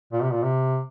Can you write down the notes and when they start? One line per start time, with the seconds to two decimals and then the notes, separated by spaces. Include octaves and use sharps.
0.12 A#2
0.22 C3
0.32 A#2
0.43 C3